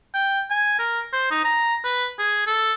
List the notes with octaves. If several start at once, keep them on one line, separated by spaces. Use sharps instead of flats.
G5
G#5
A#4
C5
D#4
A#5
B4
G#4
A4